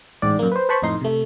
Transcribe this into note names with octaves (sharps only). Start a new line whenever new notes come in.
A1 G#2 D5
F#2 A#3
B4 C5
B4 C5 A5 B5 C#6
F2 A2 D#4 C6
C3 A3